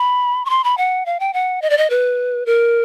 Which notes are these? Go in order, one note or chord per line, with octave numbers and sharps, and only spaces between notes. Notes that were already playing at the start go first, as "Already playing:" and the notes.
Already playing: B5
C#6
C6
B5
F#5
F5
G5
F#5
D#5
D5
D#5
B4
A#4